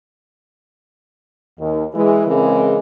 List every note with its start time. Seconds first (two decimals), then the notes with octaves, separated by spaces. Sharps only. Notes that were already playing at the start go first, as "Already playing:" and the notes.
1.59 D#2
1.94 E3 G#3
2.27 C#3 E3 G#3 C4 G#4 A#4